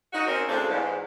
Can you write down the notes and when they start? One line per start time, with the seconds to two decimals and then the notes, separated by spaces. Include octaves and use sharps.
0.13 D#4 F#4
0.26 C4 C#4 A#4
0.49 D2 A2 C#3 G#3 C4 D4
0.69 E2 G#2